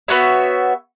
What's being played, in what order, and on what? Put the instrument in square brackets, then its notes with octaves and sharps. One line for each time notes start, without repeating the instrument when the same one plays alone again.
[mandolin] B3 F#4 C#5 E5